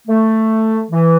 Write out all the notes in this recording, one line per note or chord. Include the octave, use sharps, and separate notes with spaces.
A3
E3